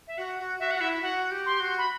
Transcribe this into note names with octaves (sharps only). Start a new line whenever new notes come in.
E5
F#4 F#5
F#4
F#4 E5
F#4 F#5
E4 E5
F#4 F#5
G4
C6
F#4
B5